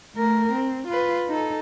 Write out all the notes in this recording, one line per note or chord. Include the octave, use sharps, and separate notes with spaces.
A3 A#4
C4
F4 B4
D#4 A4